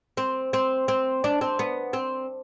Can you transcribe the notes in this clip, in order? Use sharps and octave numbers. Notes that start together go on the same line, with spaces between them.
C4
C4
C4
D4
C4
B3
C4